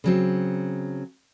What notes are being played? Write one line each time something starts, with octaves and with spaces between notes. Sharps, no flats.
C#3 F#3 C4